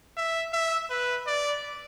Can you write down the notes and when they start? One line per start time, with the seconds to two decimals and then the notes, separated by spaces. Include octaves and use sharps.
0.17 E5
0.53 E5
0.90 B4
1.27 D5